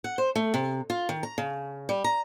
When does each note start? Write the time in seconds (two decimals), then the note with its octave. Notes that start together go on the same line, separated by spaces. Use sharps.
0.04 F#5
0.18 C5
0.36 A3
0.54 C3
0.90 F4
1.09 D#3
1.23 A#5
1.38 C#3
1.89 G3
2.04 A#5